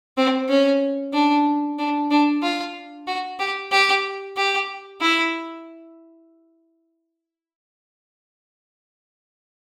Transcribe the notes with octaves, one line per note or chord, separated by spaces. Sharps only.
C4
C#4
D4
D4
D4
F4
F#4
G4
G4
G4
E4